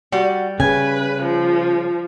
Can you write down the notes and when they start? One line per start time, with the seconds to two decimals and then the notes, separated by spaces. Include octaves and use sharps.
0.12 G3 F#4
0.60 C#3 B4 G#5
1.22 F3